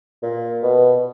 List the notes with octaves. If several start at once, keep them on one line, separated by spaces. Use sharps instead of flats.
A#2
B2